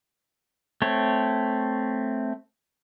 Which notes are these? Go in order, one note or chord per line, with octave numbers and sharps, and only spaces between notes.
A3 C4 C#5